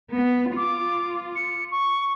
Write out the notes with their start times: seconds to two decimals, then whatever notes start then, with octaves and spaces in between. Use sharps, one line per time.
0.14 B3
0.57 F4 D6
1.36 C#7
1.71 C#6